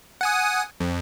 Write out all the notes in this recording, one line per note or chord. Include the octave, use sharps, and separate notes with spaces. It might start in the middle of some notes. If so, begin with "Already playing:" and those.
F#5 G#5 D#6
F2